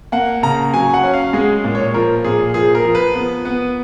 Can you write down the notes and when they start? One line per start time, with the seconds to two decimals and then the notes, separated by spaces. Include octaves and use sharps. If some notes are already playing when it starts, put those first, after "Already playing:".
0.12 A#3 F#5
0.43 C#3 A#5
0.74 F#3 G#5
0.94 F#5
1.03 C#4
1.14 F5
1.33 G#3 G#4
1.64 A#2
1.75 C#5
1.94 F3 A#4
2.24 A#2 G#4
2.54 F3 G#4
2.75 A#4
2.85 F3
2.95 B4
3.15 B3
3.45 B3